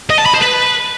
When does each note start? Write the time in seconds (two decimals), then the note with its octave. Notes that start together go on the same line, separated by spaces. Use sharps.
0.10 D#5
0.18 A5
0.26 B5
0.34 C5
0.42 B4